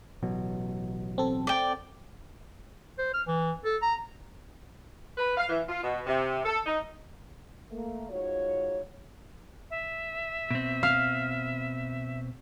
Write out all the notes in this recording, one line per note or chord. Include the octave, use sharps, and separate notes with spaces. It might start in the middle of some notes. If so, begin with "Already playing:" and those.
A1 B2 F#3
C4 A4
D5 G5
C5
F6
E3
A4
A#5
B4
F5
E3
F4
B2
C3
A4
D#4
A3 A#3
G#2 F4 F#4 C#5
E5
B2 C4
F5